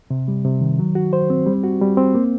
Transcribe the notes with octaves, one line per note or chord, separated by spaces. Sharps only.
C3
G3
C3
D#3
F#3
F#4
C5
C4
G3
F#4
G3
C4
A#3